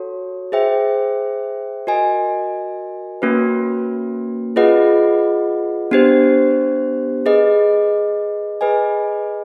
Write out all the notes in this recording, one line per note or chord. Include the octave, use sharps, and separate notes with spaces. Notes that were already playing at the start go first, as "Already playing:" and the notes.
Already playing: F#4 A4 C#5
G#4 C5 E5 G5
F#4 A#4 D#5 G#5
A#3 C#4 F#4 B4
F4 G#4 B4 D#5 F#5
B3 D4 G4 C5
G#4 B4 D#5
G#4 B4 D#5 G#5